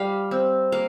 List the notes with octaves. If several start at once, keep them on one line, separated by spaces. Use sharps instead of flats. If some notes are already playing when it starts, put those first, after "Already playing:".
Already playing: G3 F5
C4
A#3 F5